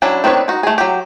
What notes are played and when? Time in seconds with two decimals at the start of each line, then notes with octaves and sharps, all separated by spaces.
0.02 F#3 C#4 D4 E4
0.24 D#3 C4 D4 B4 C#5
0.48 D#4 F#4
0.63 A3 G#4
0.78 F#3 G4